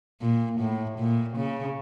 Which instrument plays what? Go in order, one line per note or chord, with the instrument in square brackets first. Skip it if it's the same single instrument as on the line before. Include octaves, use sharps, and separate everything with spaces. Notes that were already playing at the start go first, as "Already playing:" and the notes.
[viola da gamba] A#2
A2
A#2
C#3